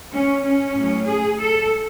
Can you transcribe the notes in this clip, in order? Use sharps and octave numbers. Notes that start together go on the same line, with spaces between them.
C#4
C#4
A2 F#3
G#4
A4